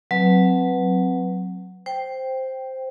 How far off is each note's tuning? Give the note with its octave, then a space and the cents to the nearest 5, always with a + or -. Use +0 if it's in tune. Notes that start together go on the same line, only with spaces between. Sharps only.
F#3 +0 C4 +0 B4 +0
C5 +0 G5 +0